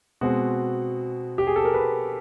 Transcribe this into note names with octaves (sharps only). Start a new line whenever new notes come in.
B2 G#3 C4 F#4
G4
G#4
A4
A#4
B4